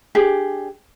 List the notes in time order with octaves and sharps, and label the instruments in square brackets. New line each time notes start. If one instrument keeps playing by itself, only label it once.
[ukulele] D4 G4 G#4